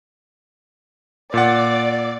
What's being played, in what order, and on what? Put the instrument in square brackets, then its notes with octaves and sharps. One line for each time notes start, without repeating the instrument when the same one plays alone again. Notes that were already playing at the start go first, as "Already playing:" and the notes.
[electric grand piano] A#2 F#5 [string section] D5